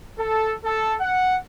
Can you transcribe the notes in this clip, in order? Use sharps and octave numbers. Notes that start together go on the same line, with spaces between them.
A4
A4
F#5